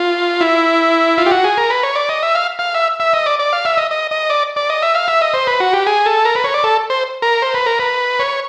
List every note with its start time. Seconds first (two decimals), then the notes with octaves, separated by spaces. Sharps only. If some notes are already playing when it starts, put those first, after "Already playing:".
Already playing: F4
0.41 E4
1.18 F4
1.26 G4
1.31 F#4
1.44 G#4
1.58 A#4
1.70 B4
1.83 C#5
1.95 D5
2.09 D#5
2.23 E5
2.35 F5
2.59 F5
2.74 E5
3.00 E5
3.13 D#5
3.26 D5
3.39 D5
3.53 F5
3.65 E5
3.77 D#5
3.91 D#5
4.11 D#5
4.30 D5
4.56 D5
4.70 D#5
4.82 E5
4.95 F5
5.08 E5
5.22 D#5
5.34 C5
5.47 B4
5.60 F#4
5.73 G4
5.86 G#4
6.06 A4
6.25 A#4
6.35 B4
6.44 C#5
6.54 D5
6.64 A4
6.90 C5
7.22 A#4
7.42 C5
7.54 B4
7.66 A#4
7.79 B4
8.19 C#5